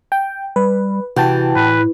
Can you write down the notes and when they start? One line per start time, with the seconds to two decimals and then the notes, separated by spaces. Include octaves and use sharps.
0.12 G5
0.56 G3 B4
1.16 C3 E3 F#4 G5 A5
1.56 A2 B4